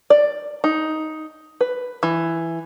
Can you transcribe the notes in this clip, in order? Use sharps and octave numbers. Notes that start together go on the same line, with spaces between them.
D5
D#4
B4
E3